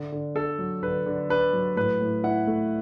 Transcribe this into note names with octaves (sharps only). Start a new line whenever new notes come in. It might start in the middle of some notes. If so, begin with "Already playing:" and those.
Already playing: D3
D3
D4 A4
F#3
D3 B4
D3
D4 B4
F#3
A2 B4
A2
E4 F#5
A3